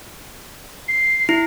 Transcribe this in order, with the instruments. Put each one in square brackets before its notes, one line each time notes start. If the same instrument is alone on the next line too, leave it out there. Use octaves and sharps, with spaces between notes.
[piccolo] C7
[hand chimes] E4